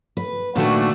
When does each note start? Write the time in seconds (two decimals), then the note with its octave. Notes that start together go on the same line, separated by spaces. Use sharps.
0.17 B4
0.56 A#2 D#3 A3 D4 F#4